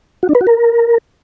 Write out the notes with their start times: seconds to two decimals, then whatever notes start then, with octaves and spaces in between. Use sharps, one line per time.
0.23 F#4
0.29 D4
0.35 B4
0.41 F#4
0.47 A#4